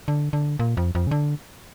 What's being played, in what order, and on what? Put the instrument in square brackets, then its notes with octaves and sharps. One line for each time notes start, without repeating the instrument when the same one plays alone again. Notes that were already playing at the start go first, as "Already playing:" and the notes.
[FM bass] D3
D3
A#2
F2
F2
C#3
D3